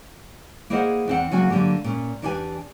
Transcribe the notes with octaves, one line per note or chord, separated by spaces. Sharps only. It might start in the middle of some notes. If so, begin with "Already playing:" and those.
A#3 E4 G#4 C5 D#5 F#5
E2 C4 F#5
C#3 F#3 A#3 F#4 F#5 G#5
D3 F#3 A#3 G4
A#2 C#4
E2 D4 E4 G4 B4 G#5